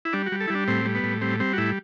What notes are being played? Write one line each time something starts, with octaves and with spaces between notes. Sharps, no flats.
E4
G3 D4
F#4
G3
A4
E4
G3 D4
A2 C4
G3
B3
A2
G3 C4
G3 C4
F#4
A2 E4